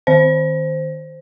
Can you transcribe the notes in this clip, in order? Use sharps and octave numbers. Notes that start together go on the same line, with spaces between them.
D#3 C5